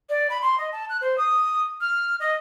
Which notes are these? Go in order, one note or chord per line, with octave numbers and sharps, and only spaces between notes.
D5
B5
C6
D#5
A5
F#6
C5
D#6
F6
D#5